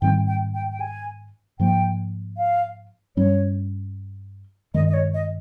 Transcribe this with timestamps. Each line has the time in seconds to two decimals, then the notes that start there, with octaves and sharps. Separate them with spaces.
0.02 G#2 D#3 G3 C4 G5
0.27 G5
0.54 G5
0.71 G5
0.80 G#5
1.60 G#2 F3 A#3 G5
2.37 F5
3.17 G2 G3 C#4 C#5
4.74 G2 D#3 G#3 D#5
4.88 D#5
4.94 C#5
5.14 D#5